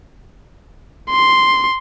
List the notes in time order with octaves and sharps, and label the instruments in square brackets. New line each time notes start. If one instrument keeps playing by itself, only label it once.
[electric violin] C6